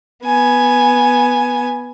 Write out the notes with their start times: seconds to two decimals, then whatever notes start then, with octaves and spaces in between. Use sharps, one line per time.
0.25 B3 G#5